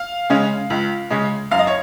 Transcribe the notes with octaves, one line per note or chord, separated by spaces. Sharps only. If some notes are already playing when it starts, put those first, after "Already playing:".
Already playing: F5
C#3 G#3 C#4
C#2
C#3 G#3 C#4
F#2 F5
D#5
C#5